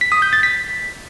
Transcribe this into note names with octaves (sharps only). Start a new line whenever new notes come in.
B6
D#6
G6
A6
B6